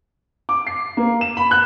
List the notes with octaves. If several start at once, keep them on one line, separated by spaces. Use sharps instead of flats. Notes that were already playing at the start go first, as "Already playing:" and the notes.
D6
C7
A#3
E7
B5
F#6